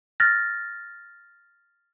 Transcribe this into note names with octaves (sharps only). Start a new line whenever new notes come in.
F6 F#6 A6 A#6